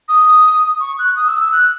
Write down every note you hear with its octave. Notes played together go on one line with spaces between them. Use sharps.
D#6
C#6
F#6
D#6
E6
E6
F#6